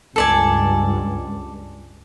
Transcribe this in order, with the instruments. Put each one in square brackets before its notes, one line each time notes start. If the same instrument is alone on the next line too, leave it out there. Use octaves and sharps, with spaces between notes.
[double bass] C#2 G2 [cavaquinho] A4 D5 G#5